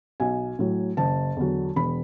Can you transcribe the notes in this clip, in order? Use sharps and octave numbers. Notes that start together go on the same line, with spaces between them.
B1 G#5
A2 F#3
F#1 A5
E2 D3 F#3
E1 B5